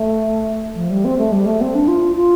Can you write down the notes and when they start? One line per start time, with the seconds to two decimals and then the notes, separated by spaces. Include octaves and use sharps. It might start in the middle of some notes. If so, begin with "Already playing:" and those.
Already playing: A3
0.75 F3
0.90 G3
1.04 C4
1.18 A3
1.32 G3
1.46 A3
1.61 C4
1.75 D4
1.88 F4
2.16 F4